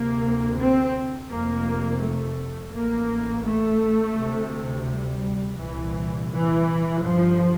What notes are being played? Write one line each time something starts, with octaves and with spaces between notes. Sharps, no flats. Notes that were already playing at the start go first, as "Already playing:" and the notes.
Already playing: D2 C3 A#3
C4
F1 F2 C3 A#3
A3
A1 A2 A#3
A3
D2 C3
G3
C2 A#2 E3
E3
G1 G2 F3